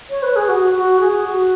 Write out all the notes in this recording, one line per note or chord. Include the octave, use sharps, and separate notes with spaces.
C#5
B4
G#4
F#4
F#4
G#4
F#4